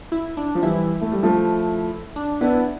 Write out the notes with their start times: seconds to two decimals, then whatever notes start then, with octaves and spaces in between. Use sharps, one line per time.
0.12 E4
0.37 D4
0.55 F3
0.62 E3 G3 E4
1.01 A3
1.12 G3
1.23 F3 A3
2.16 D4
2.41 B3 D4 E4